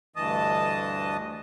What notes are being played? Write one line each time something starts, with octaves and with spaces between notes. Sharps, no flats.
D2 G2 E3 D#5 A5 D#6